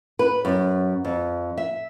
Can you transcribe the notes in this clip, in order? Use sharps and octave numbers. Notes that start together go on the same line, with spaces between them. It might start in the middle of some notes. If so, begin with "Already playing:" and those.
B4
F#2
F2
E5